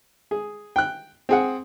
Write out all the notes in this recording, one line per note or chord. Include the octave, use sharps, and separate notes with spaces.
G#4
G5 F#6
C4 G#4 F#5